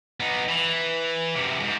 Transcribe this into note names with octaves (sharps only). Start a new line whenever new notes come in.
B3 D#4
E3
F#2 C3
F2 G#2